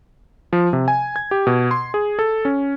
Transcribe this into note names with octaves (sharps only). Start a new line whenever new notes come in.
F3
C3
G#5
G#6
G4
B2
C6
G#4
A4
C#4